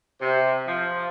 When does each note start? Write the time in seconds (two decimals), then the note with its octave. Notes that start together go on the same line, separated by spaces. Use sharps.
0.21 C3
0.67 F3